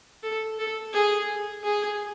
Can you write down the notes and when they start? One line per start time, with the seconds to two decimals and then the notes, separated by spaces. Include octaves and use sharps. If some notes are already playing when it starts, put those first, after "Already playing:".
0.23 A4
0.59 A4
0.93 G#4
1.63 G#4